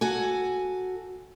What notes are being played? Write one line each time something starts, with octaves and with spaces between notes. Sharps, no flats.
F#4 A4 G#5